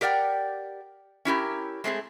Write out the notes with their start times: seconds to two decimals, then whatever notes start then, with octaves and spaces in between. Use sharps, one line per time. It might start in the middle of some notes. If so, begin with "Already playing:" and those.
0.01 G4 A#4 D5 F#5 G5
1.25 C#4 E4 G4 A#4
1.84 G#3 A3 C4 G#4